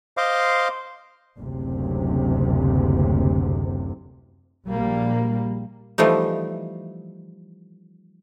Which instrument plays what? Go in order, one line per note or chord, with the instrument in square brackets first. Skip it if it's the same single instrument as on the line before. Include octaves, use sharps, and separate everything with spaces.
[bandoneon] C5 D#5 F5 C6 D6
[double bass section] F#1 D2 C3
A#1 G3 A#3
[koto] E3 F3 G3 A3 D#4